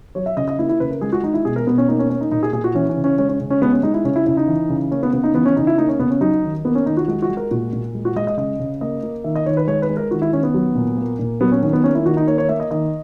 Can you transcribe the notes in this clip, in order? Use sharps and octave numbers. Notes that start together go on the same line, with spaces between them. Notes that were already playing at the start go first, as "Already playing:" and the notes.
F#3 C#5
E5
C#3 D#5
D#5
A#3 E4
E4
C#3 B4
A#4
G#3 G#4
F#4
G#3 D#4
E4
B2 G#4
A#4
B2 B3
C#4
A#3 D#4
C#4
A#3 C#4
D#4
A#2 D#4
G#4
A#2 G#4
F#4
E3 C#4
C#4
C#3
C#4
G#3 C#4
C#4
C#3
C#4
G#3 B3
C#4
G#3 D#4
E4
C#3 C#4
E4
C#3 E4
D#4
E3
C#3
A#3 C#4
B3
C#3 B3
D#4
E3 B3
C#4
C#3 D#4
E4
A#3 D#4
C#4
C#3 B3
C#4
F#3 D#4
D#3
A#3 B3
C#4
D#3 D#4
F#4
G#3 F#4
F#4
G#3
A#4
A#2 F#4
A#2
G#3
F#4
G#3 D#5
D#5
C#3 D#5
C#3
A#3 D#5
A#3
D#3 E5
D#5
D#3 C#5
B4
G#3 C#5
B4
G#3
A#4
D#3 F#4
E4
D#3 C#4
B3
F#3
A#2
A#3
A#2
F#3 B3
C#4
D#3 C#4
B3
A#3 C#4
E4
D#3 F#4
D#4
A#3 C#5
C#5
A#3 E5
D#5
D#3 D#5